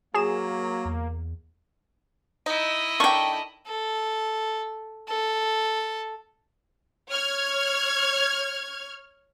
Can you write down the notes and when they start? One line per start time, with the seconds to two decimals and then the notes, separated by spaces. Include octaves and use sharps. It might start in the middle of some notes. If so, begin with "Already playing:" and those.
0.14 F#3 A#3 G#4 E7
0.85 E2
2.46 D#4 E4 D#5
3.00 D#3 D4 A4 G5 C#6
3.67 A4
5.08 A4
7.09 C#5 F6 G#6